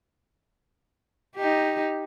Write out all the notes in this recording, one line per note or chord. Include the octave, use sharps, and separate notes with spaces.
D#4 G4